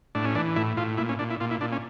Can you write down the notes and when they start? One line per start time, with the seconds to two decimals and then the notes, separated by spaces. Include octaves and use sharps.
0.15 A2 D4
0.24 C#4
0.35 E3 D4
0.56 A2 E4
0.77 A2 F4
0.98 A#2 E4
1.09 C#4
1.19 A#2 D4
1.30 E4
1.40 A#2 F4
1.51 E4
1.61 A#2 D4
1.72 C#4